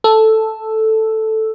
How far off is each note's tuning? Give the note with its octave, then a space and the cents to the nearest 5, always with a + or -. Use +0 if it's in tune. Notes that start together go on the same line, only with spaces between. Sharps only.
A4 +0 E6 +0